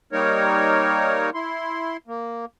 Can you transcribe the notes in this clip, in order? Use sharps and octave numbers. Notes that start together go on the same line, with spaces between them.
G3 A#3 D#4 A#4 C#5
E4 C6
A#3